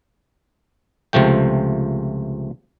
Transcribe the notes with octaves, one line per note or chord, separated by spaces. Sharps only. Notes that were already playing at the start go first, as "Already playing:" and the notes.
C#2 C3 F3 A3 G5